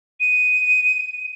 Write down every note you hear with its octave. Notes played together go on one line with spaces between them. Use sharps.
D#7